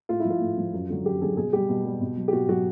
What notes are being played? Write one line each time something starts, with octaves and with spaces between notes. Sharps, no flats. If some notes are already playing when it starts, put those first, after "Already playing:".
A2 F4
E4
F3
F4
A2
F3
F#2
D3 F#3
F#2 G4
D3 F#3 G#4
B2 G#4
G3 G4
B2
G3
B2
F#3
G4
B2 F#4
F#3 F#4